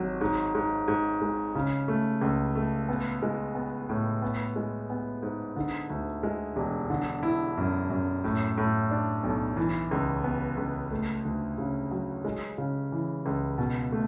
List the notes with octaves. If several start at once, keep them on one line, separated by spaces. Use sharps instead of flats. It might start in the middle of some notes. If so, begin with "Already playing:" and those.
Already playing: G#1 F#3
G#2
G#2
G#2
G#3
C#3
A3
C#2
A3
B3
G#3
B3
A2
B3
G#3
B3
G#2
D3
D2
G#3
E1
D3
E4
F#2
F#2
A2
A2
D4
B1
E3
C#2
B3
C#2
A3
D2
C#3
F#3
G#3
C#3
E3
C#2
B2
A3